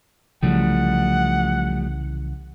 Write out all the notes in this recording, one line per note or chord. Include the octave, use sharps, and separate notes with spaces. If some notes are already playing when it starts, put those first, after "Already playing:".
C2 C#3 E3 F3 G3 A3 F#5